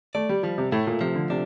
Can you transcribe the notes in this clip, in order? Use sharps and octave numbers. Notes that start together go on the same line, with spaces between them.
A3 D5
G3
F3 G3
C3
A2 A3
A#2
C3 F3
D3
C3 D4